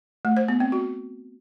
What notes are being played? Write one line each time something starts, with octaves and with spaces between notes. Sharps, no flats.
A3
C5
B3
C4
F#4